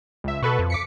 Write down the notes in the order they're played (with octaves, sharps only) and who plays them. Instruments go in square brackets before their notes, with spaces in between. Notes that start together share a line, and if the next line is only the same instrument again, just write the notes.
[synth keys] C#2 E5
[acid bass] B2 [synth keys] A4 B4 C#6
[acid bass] F2
[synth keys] D6 B6 C#7